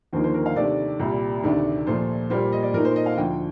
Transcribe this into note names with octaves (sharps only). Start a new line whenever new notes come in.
D#2 D3 F3 A#3 D#4 C5
C5
A#4
F5
C3 D#3 A3 D4 D5
C2 A#2 G3
D2 C3 D#3 A3 D4
A#2 F3 A3 C5
A#2 G3 A#3 C5
D#5
D5
A#2 A3 D#4 A#4
C5
D#5
F5
D2 D3 F3 G5